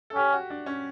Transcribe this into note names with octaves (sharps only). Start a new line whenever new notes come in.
A4
C#4 G4
F#4
D4
C#4